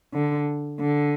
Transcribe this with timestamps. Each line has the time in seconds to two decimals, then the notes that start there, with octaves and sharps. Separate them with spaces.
0.13 D3
0.80 D3